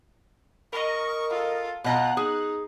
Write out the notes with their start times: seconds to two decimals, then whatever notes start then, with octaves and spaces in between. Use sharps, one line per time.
0.73 A#4 D#5 C#6
1.30 F4 A4
1.84 B2 F4 D#5 F#5 A#5 F#6
2.17 D#4 G#4